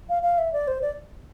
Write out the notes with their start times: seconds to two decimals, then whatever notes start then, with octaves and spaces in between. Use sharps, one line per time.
0.09 F5
0.23 F5
0.38 E5
0.53 D5
0.68 C5
0.82 D5